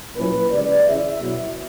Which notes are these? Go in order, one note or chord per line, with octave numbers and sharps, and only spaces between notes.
A#2 F#3 C#4 E4 B4
C#2 C#3 G3 A#3 D5
C#2 C#3 E3 E5
B2 F#3 B3 E4